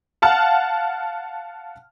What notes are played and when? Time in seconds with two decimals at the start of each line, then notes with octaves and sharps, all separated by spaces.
0.22 F5 F#5 A5 F6